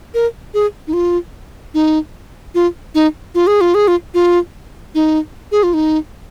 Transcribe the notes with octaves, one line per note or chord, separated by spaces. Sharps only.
A#4
G#4
D#4
F4
D#4
F4
D#4
F4
G#4
F4
G#4
F4
F4
D#4
G#4
F4
D#4